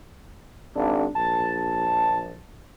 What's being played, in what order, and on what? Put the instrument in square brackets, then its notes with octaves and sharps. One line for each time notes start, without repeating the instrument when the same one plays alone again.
[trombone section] G#1 [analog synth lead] D4
[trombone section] A#1 [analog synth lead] A5